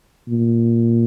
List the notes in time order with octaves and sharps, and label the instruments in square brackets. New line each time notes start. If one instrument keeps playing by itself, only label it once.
[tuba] A#2